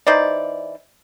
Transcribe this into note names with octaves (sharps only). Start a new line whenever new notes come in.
E3 D#4 C5 D5